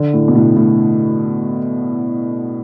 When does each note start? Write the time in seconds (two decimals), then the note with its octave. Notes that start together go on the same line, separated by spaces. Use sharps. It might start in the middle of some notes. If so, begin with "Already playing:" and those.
Already playing: D3
0.14 A2
0.28 B2
0.35 A2
0.57 A2